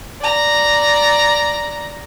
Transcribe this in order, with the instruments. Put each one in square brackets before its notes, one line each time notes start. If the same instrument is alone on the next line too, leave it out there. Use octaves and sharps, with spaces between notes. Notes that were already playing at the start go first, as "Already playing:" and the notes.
[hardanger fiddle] D5 A#5